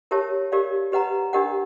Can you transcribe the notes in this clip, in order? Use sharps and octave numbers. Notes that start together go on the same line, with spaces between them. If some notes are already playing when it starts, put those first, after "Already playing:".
G4 A#4 C#5 E5 A5
G4 A#4 D5 F5
G4 B4 D#5 F#5 A#5
D4 G4 A#4 D#5 F#5